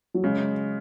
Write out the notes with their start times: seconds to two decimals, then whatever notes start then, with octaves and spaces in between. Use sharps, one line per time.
0.14 F#3
0.23 C#3 G#3